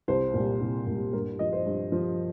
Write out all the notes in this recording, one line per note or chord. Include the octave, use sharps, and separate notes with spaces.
C2 C5
A#2 G3
C2
A#2
G3
G2 A#4
F3 D#5
C5
G2
F3